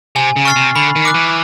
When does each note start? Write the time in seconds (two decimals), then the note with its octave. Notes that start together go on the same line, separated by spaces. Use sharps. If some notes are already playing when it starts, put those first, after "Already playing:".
0.16 C3 G#5
0.36 C#3
0.45 C#6 F6 A6 C7
0.56 C3
0.76 D3 B5
0.96 D#3
1.05 D6 F#6
1.14 E3